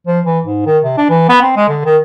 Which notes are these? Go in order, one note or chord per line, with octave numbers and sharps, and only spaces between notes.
F3
E3
G#2
D#3
C3
D4
E3
B3
C4
G#3
D3
D#3